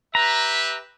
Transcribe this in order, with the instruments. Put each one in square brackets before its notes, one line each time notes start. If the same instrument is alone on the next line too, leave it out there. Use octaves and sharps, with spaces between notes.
[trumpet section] G4 B4 E5 [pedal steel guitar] A#5